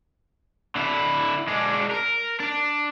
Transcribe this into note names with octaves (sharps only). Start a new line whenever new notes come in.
D3 E4
G#3 D4
A#4
D4